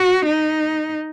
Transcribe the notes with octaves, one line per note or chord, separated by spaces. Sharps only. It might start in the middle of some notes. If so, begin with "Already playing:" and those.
Already playing: F#4
D#4